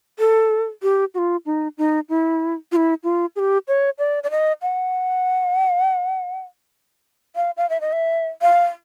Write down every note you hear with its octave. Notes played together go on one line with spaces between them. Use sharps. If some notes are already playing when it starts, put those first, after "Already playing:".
A4
G4
F#4
F4
D#4
D#4
E4
F4
E4
F4
G#4
G4
C#5
D5
D5
D#5
F#5
F5
F5
E5
D#5
E5
F5